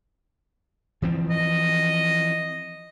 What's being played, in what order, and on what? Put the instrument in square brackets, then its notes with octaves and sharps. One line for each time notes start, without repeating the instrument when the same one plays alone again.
[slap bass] E3 F3 C4
[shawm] D#5